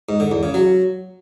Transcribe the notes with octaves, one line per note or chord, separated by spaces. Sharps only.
G#2
D3
E2
C#3
F#3